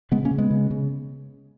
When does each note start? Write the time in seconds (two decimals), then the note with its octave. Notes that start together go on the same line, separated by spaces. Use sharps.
0.11 C#3 G#3 B3
0.25 A#3 C#4
0.31 C#3
0.38 G#3 B3
0.51 C#3
0.71 C#3